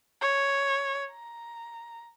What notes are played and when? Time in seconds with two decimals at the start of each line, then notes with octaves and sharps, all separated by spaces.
0.22 C#5
1.11 A#5